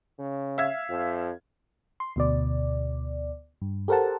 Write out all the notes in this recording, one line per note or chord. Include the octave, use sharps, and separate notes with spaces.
C#3
E5 F5 G#6
F2
C6
D2 B2 D5
G2
G4 A4 A#4 C5 F#5 A5